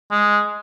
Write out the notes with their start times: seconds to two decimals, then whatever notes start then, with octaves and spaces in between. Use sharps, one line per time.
0.11 G#3